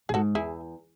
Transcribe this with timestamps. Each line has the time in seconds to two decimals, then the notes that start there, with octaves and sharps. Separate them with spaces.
0.09 A2 G#4
0.14 G#2 F#4 A4
0.35 E2 E4 G#4